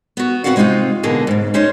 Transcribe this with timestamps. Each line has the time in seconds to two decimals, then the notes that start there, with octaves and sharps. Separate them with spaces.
0.17 B3 F#4
0.44 C4 D4 F#4 B4 F5 F#5
0.56 C3 G#3 C4 D#4 F4
1.03 B2 D3 A#3 B3 G#4
1.27 G#2 C#3
1.54 C#4 D#4 C5 C#5 D#5